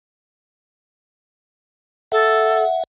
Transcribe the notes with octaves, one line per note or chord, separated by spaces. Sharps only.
A4 E5 F#5